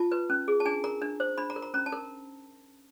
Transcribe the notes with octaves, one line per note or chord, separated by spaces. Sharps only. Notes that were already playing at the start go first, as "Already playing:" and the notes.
Already playing: F4 A5
B4
C#4
G#4
A5
D4 G#5
A#4 A#5
D4
C5
D4 B5
A#5
A#4
A#5
C#4 A#5
A5
A#4